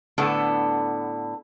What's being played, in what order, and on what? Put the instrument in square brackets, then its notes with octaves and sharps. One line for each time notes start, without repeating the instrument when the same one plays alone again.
[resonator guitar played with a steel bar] A2 D3 B3 A4